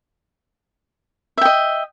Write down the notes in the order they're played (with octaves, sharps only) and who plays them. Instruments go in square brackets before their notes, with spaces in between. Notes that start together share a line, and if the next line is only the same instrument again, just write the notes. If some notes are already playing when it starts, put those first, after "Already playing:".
[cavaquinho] E5
G5
D#5